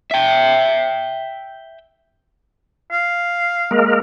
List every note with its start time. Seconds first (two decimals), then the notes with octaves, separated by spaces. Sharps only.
0.11 E5 G5
2.91 F5
3.71 G#3 A#3 A#4